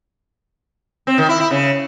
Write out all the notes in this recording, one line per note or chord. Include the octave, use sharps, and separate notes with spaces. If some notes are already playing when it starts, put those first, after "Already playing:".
C4
D#3
E4
E4
C#3